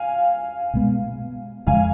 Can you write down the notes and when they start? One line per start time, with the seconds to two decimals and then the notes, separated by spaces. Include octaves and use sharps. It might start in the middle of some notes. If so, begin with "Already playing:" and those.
Already playing: F5 G#5
0.74 B2 G#3 B3
1.67 F2 C#3 G#3 F5 G#5